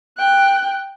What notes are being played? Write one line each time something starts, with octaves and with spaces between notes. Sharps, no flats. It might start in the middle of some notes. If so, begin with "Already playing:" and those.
G5 F#6